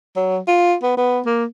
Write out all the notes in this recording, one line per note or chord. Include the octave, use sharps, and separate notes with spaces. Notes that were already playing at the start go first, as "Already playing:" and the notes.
F#3
F4
B3
B3
A#3